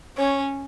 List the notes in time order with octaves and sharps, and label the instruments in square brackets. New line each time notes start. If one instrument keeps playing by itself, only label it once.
[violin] C#4 [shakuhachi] C#5